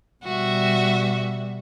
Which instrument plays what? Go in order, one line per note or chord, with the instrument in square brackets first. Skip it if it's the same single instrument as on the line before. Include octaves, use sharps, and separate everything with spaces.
[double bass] B2 G3 [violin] F#4 E5